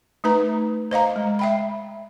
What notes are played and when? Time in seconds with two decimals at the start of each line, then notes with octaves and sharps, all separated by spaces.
0.24 A3 D#4 B4 A#5
0.91 C5 D#5 F5 A#5
1.16 G#3
1.39 E5 G5 B5